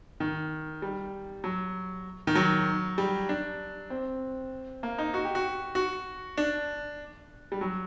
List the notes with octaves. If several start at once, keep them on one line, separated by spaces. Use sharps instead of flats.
D#3
G3
F#3
D#3
F#3
G3
D4
C4
A#3
D#4
F#4
G4
F#4
F#4
D4
G3
F#3